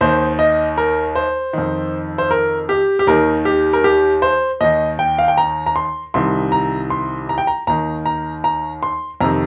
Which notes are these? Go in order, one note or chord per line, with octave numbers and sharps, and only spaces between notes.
D#2 D#3 C5
D#5
A#4
C5
F2 D#3
C5
A#4
G4
G4
D#2 D#3 A#4
G4
A#4
G4
C5
D#2 D#3 D#5
G5
F5
G5
A#5
A#5
C6
C2 C3 D#3 C6
A#5
C6
A#5
G5
A#5
D#2 D#3 A#5
A#5
A#5
C6
F2 C3 D#3 A#5